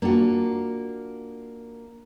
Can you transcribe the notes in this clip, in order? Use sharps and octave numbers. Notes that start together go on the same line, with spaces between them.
A#3 D4 F4 F#4